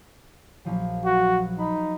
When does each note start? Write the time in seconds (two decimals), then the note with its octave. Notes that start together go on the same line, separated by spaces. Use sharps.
0.65 A#1 F3 F#3
1.05 F#4
1.59 D#4 B5 B6